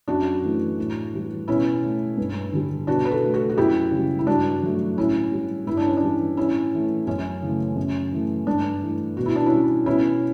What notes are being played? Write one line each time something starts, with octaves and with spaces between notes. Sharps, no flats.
F#2 D4 F#4
E3 A3
A2
E3 G3
B2 C#4 E4
A3
G2
D3 G3
B2 D4 F#4
B4
F#4 A4
A3
F#4 A4
F#4
F#2 E4 G4
C#3 G3
E4
G2 D4 F#4
F#3 A3
A2 C#4 E4
G3
G2 E4
D4
C#4
D4
E3 G3
A2 C#4 E4
E3 A3
F#2 C#4
C#3 E3 A3
F#2
E3 A3
G2 D4
E3 A3
B2 F#4
E4
D4
C#4 E4
G3
B2 C#4 E4